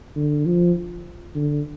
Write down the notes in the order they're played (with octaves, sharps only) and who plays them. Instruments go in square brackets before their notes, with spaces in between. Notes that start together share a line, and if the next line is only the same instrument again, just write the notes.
[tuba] D3
F3
D3